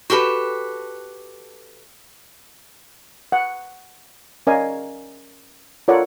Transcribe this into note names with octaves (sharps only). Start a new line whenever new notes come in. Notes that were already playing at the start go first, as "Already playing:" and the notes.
F#4 G4 A4 B4
F#5
C#4 A#4 D5 D#5 F5 G#5
F4 A4 A#4 C#5 D5 F#5